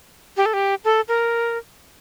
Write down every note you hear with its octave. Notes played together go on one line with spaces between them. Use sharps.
G4
A4
G4
A4
A#4